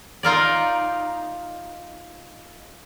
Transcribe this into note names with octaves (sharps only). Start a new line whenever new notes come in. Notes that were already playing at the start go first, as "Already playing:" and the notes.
D#4 F4 A#4 D5